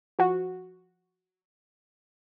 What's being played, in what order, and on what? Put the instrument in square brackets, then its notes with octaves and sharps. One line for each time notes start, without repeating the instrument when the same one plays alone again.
[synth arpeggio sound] F3 F#4